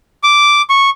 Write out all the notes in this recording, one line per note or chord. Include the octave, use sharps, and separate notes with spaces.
D6
C#6